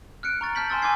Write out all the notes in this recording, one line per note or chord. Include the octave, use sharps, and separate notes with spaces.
F6 F#6 C#7 D7
A#5 C#6 A6
A5 F6 G6 B6 F#7
G#5 A5 C6 C#6 E6 A6
G#5 C6 D6 E6 G#6 C7